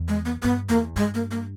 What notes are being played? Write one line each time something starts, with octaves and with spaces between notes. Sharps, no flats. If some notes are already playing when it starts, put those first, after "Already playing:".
Already playing: E2
G#3
B3
G2 B3
E2 A#3
G2 G#3
A#3
A#3